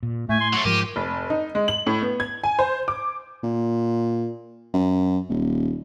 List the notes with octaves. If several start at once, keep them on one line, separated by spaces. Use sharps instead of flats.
A#2
A2 A3 G#5
C6
F#3 A3 C#6
G#2 F3 G4 A#4 D#7
F1
D#4
G#3
F#7
A2
B3
G#6
G#5
C5
D6
A#2
F#2
D#1